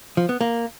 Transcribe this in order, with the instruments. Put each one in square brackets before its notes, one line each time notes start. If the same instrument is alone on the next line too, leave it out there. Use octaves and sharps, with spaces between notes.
[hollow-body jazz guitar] F3
B3
A#3